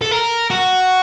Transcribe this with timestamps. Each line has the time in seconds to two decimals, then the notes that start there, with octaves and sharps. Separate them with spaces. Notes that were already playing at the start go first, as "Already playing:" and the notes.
0.02 A4
0.11 A#4
0.50 F#4